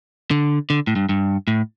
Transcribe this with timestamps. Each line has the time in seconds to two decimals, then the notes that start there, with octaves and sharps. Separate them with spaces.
0.31 D3
0.70 D3
0.87 A2
0.96 G2
1.09 G2
1.48 A2